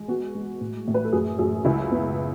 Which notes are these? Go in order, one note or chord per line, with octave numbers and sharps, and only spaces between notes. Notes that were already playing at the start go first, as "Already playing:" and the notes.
Already playing: G#3
B3 F#4
G#3
A2
A2
B4
A4
F#2 G#4
F#2 G#4
C#2 E4
B3